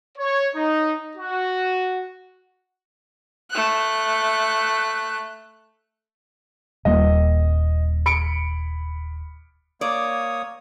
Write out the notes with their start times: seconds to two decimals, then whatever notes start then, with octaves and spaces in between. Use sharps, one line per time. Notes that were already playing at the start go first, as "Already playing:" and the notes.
0.18 C#5
0.55 D#4
1.17 F#4
3.51 A3 F#6
6.85 D#1 G3 A#3 D#5
8.06 B5 C#7 D7
9.81 A#3 C#5 D5 D#6